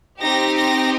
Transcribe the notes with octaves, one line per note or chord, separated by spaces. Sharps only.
C4 D#4 G4 A#6
A#6